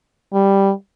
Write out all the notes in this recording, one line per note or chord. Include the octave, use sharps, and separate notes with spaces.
G3